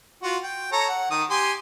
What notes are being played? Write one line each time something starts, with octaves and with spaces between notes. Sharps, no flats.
F4 F#4 F#5
G5
A4 C#5 A#5
F#5
D#3 D#6
G4 G#5 C6